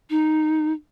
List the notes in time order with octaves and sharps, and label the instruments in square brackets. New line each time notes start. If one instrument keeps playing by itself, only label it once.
[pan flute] D#4